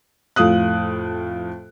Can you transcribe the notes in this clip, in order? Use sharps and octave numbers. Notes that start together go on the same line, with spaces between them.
F2 A2 F5 D#6 F#6